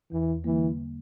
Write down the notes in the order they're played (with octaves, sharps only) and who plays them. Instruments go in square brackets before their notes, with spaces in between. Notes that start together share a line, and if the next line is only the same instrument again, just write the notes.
[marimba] E2 [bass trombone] E3
[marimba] D3 G3 A#3 [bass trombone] E3